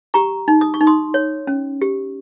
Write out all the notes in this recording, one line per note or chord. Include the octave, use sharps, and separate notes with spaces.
G4 A#5 C#6
D#4
D#6
C#6
D#4
C6 D#6
C#5
C#4
G4